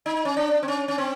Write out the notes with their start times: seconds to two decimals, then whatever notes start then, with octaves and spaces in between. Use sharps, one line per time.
0.06 D#4
0.25 C#4
0.37 D4
0.63 C4
0.68 C#4
0.88 C#4
0.98 C4